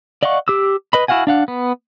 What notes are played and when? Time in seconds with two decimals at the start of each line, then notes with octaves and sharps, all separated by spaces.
0.23 D5 D#5 F5 F#5 C#6
0.48 G4 D6 E6
0.93 B4 D#5 B5
1.08 E4 F#4 F5 F#5 G#5
1.27 D4 F5 F#5
1.48 B3